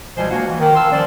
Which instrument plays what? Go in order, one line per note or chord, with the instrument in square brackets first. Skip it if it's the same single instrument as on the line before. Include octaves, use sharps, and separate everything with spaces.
[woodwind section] C#2 B2 F3 G3 C5 G#5
A#3 D4 F4 F#4 F#5 G#5
E3
D#3
F5 A5 C6 E6
D#3 F3 G3 C#4 C5 D5